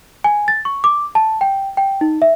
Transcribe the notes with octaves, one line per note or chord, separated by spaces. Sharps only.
G#5
A6
C#6
D6
A5
G5
G5
D#4
E5